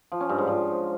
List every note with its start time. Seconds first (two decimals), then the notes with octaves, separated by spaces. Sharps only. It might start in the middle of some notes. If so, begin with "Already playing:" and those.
0.12 F3
0.20 C#4
0.29 G2
0.38 G#2
0.47 F3